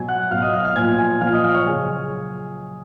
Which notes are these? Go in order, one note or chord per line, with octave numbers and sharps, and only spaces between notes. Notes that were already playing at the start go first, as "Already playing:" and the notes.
Already playing: B2 F#3 G#5 G#6
F#5 F#6
B2 F#3 F5 F6
D#5 D#6
F5 F6
F5 F6
A#2 F3 G#5 G#6
G#5 G#6
A#2 F3 F5 F6
D#5 D#6
F5 F6
C#5 C#6
C#3 F#3 G#4 G#5